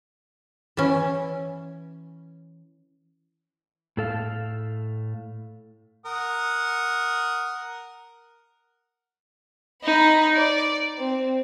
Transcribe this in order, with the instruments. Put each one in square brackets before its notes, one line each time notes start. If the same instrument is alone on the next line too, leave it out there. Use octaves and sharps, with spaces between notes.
[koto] E3 C#4
[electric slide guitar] A2 A4 F5
[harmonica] A#4 F#5 D#6
[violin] D#4 B5
D5
C4